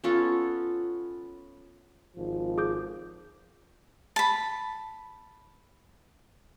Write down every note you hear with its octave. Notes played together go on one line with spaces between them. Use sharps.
B3 C#4 F4 A4
G#1 F3
G#4 D6 G6
A5 B5